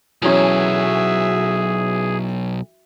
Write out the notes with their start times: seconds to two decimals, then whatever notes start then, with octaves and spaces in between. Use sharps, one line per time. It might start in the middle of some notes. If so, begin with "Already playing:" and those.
0.22 B1 E3 F#3 C#4 F#4 G#4 E5